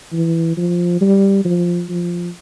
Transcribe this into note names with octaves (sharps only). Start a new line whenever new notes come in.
E3
F3
G3
F3
F3